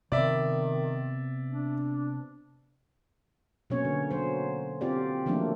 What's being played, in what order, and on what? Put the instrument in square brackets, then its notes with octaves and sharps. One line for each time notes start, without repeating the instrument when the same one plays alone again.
[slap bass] C3 B3 [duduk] D#3 [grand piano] D5 E5
[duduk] D4
[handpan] B2 F#3 A#3 B3 C#4 C#5
D3
F#3 C5
C4 F4 G4 D5
D#3 F3 F#3 A3 A#3 D4